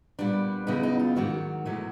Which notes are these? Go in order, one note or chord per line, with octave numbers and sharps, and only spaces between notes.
A#2 G3 B3 D4
E2 C#3 F#3 B3 D#4
D#4
F4
G#2 D#3 F#3 F#4
E2 B2 F#3 A3